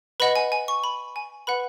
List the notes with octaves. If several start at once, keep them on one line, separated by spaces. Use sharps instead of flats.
B4 D#5 F#5 B5
G#5
G#5
C#6
B5
G#5
B4 F#5 B5